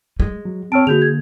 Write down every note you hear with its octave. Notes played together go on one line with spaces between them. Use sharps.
G#3
F#3
C4 C#5 A5 F6 D7
D3 A#3 F#4 G#4 G6 F7
G#6